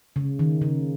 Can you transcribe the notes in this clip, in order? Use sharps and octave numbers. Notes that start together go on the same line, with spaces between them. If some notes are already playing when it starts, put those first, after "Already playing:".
C#3
D#3
C#3